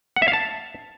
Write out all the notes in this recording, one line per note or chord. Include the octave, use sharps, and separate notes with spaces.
F#5
E5
F5
A5